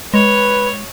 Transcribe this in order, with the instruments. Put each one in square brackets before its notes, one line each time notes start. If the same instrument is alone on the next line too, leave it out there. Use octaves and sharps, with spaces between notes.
[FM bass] G#3 [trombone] B4 [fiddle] C#5